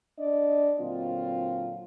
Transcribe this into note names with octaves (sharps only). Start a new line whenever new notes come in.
D4 D5 D#5
A#2 D3 F#3 C4 F4